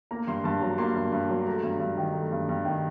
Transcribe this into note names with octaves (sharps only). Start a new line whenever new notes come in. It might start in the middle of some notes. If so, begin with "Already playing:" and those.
A#3 A#5
G2 C6
G2 A5
F#3 A#5
A#3 C6
G2
G2
F#3
A3 A#5
G2
G2
D#3
A3
G2
G2
D#3